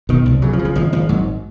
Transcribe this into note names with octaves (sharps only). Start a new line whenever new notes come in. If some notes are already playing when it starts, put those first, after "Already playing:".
B2 D#3
C2
C#3 F#3
F3
C#3
F3
G#1 F3
G#1 F3
G#2 F#3